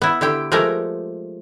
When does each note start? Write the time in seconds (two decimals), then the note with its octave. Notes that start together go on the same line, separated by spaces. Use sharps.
0.02 B3 E4
0.21 D3 E4 G4 G5
0.52 F3 G#3 A3 G4 A#4 D5